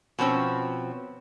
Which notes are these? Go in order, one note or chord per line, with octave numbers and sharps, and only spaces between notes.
B2 F3 C4 C#4